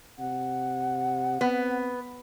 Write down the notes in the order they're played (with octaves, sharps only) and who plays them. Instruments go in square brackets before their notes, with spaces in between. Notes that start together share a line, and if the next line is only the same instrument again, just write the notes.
[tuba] C3 [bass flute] F#5
[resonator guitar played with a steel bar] B3 [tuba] C4